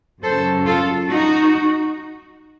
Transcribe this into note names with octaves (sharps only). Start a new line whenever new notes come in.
F#2 C#3 F#3 A4 C5
F4 A4
D#4 F#4